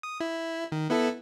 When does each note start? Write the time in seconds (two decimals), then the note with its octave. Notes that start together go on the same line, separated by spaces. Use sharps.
0.03 D#6
0.20 E4
0.72 D#3
0.90 B3 E4 A4